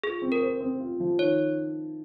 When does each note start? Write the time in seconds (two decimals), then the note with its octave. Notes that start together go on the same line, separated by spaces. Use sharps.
0.03 F4 G#4
0.22 C4
0.32 A#4
0.42 C5
0.60 C4
0.80 F4
1.00 F3
1.19 D#3 C#5